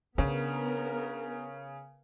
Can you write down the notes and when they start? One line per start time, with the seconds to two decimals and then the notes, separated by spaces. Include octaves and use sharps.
0.18 C#3 B3 D4 A#4